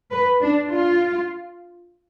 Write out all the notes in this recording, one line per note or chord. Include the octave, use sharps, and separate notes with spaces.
B4
D4
F4